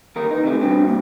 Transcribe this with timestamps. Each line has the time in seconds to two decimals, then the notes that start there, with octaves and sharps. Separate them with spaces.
0.16 D#2 A#3 A#4
0.31 D#4 B4
0.43 C3 D#3 A3
0.61 G2 B2 C4 D4
0.87 A#3